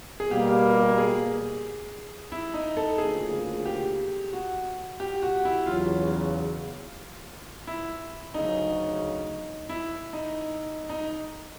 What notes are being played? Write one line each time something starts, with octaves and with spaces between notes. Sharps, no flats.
G#4
B2 G3 A#3 G4
G#4
E4
D#4
A4
D2 C#3 F3 A#3 G#4
G4
F#4
G4
F#4
E4
E2 C#3 F#3 F4
E4
D2 C#3 F#3 D#4
E4
D#4
D#4